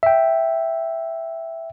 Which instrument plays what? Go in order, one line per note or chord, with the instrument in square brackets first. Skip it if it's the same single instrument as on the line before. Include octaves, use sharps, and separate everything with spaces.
[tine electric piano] E5 G5